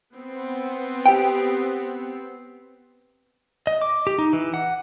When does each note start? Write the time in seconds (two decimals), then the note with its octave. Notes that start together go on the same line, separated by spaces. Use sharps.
0.15 B3 C4
1.06 G4 G5
3.67 D#5
3.82 D6
4.07 G4
4.18 D#4
4.33 E3
4.54 F#5